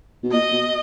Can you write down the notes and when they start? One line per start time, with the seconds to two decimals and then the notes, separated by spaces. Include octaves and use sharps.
0.23 B2
0.32 A#2 D#5
0.52 B2